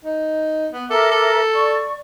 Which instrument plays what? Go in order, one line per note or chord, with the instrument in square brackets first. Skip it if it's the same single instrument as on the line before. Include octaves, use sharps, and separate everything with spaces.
[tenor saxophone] D#4
B3
[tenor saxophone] A4 [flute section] A#4 E5 D6
[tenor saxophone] A4
[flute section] D5 C#6